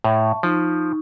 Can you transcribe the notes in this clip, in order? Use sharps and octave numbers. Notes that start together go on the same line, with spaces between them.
A2 E5 A5 C#6
F3 D#4 C#6